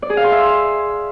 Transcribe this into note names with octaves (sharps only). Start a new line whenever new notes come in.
D5
G#4
F5
C6
E5